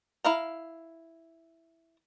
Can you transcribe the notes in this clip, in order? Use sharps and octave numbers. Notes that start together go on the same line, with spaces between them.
E4 F5 A#5